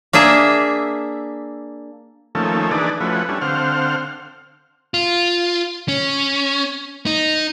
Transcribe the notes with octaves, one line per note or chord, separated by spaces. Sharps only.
A#3 D4 G#4 E5
D#3 F3 A3 A#3 C#4 A4
E3 D4 D#4 G#4 B4 D5
F3 A3 C#4 E4 F#4 B4
G3 C#4 D4 E4 A4
D3 C4 C5 F5 F#5 F6
F4
C#4
D#4